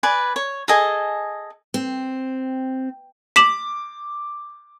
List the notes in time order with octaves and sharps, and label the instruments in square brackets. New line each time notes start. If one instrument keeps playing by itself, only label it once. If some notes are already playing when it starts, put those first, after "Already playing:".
[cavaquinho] B4 D5 G#5
C#5
G#4 A4 D#5 G#5
[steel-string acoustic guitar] C4
[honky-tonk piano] D6 [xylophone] B6 E7 F#7